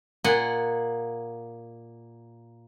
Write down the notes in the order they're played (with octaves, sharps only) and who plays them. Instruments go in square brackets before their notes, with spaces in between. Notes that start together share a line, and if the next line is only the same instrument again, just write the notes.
[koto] A#2 D#5 F#5 G#5